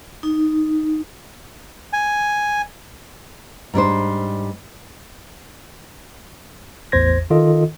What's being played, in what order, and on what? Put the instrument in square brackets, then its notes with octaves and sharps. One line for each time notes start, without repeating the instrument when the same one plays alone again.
[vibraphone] D#4
[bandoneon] G#5
[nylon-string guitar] G#2 G3 D4 C5
[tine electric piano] A1 E2 C5 G#6 A#6
D#3 F4 A4 D#5